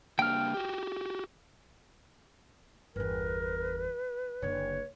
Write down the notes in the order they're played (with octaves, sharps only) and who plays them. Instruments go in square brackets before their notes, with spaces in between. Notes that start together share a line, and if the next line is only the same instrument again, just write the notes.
[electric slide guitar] C#3 A#3 D4 [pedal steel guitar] G5 F6
[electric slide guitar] F#4 G4
[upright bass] G1 E2 [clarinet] A#4 [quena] B4
[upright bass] F#1 D3 [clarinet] C#5